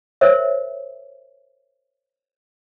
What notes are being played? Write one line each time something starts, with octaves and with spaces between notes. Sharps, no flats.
A#4 C5 C#5 E5